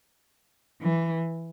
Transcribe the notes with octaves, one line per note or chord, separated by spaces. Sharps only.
E3